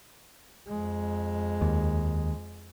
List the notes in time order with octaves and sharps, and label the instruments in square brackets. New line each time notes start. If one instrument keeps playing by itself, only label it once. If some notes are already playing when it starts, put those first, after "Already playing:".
[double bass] F2 G#3
[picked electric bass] D#2